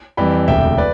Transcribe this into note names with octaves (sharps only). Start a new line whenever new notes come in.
F2 E3 G3 G5 B5
E1 D2 C3 E5 G5
B4 D5